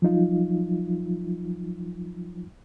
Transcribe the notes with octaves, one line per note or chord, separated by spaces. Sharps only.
F3 F#3 D#4 F4